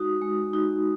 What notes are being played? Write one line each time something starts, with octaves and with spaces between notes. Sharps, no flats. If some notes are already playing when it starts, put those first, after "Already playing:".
Already playing: G#3 D#4 F#4 D#6
G#3
D#4 F#4